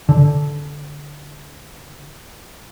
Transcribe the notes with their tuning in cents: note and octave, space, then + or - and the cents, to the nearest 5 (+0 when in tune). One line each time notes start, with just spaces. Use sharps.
D3 -15